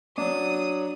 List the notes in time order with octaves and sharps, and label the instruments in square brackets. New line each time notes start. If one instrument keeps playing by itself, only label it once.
[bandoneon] F#3 [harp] D4 [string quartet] D#6